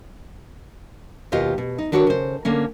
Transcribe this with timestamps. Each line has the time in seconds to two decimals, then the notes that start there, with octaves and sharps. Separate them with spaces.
1.32 D#2 B2 F4 G4 D#5 F5
1.58 B2
1.78 D#4
1.92 D#3 D4 F#4 A4 C#5
2.07 C#3 C5
2.45 D3 A#3 C#4